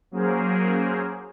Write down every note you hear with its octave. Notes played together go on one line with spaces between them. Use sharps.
F#3 A#3 C#4 G#4 A#4 C5